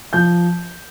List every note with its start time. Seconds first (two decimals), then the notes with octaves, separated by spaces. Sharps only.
0.13 F3 G6